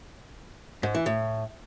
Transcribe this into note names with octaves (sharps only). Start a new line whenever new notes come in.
G#2
E3
A2